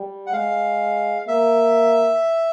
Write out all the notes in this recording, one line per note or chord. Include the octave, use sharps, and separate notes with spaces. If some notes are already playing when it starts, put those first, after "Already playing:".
Already playing: G3
F#5
G#3 F5
A#3 E5